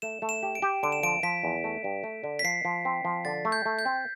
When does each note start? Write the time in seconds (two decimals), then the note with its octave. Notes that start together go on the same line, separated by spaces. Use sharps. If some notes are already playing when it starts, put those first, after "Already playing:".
0.02 A3 E7
0.22 A3
0.29 E7
0.43 G4
0.55 D7
0.62 G4
0.83 D3 D7
0.92 E7
1.03 F3 D7
1.23 F3 B6
1.43 E2
1.64 A3
1.84 G2
2.04 A3
2.24 D3
2.39 B6
2.44 F3 C7
2.65 F3
2.85 C4
3.05 F3
3.25 D3 A6
3.45 A3
3.52 G6
3.66 A3
3.79 G6
3.85 C4